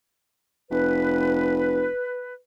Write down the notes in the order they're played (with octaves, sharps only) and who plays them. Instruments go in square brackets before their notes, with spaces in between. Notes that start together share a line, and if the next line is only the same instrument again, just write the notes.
[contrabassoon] F1 [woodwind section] B4